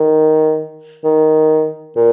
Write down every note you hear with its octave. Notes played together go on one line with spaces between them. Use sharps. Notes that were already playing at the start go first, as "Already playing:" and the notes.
Already playing: D#3
D#3
A#2